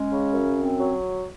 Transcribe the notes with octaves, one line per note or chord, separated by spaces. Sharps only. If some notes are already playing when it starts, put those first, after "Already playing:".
Already playing: G#3 C#4
C#3
F#2
C4
F#3